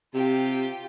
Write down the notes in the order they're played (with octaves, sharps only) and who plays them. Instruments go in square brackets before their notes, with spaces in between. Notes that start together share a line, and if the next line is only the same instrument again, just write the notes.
[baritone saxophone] C3 [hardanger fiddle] F4 G4